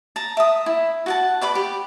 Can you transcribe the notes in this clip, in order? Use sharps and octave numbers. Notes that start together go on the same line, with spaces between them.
A5 A#5
E5 D#6
E4
F#4 F#5 A5
B4 D5 B5 D6
G4